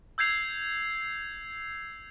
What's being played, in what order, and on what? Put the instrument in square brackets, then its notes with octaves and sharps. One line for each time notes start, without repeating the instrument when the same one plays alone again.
[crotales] E6 G6 G#6 C7 F7